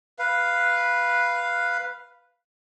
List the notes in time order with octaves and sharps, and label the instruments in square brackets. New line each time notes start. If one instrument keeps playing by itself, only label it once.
[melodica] B4 F5